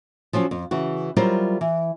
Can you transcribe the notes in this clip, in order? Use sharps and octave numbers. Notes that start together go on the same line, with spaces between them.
F3 F#3 C#4 F4
F2
C#3 E3 F#4
F#3 G3 E4 F4 A#4 C5
E3